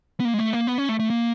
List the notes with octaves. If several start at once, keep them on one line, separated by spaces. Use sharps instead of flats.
B3
A#3
G#3
A3
A#3
B3
C#4
A3
A3
A#3